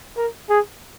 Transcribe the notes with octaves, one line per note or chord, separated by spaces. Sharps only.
A#4
G#4